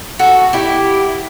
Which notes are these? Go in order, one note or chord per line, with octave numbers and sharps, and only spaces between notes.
F#4 A4
E4 G4